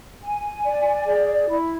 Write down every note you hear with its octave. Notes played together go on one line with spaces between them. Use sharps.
G#5
D5
G#4
E4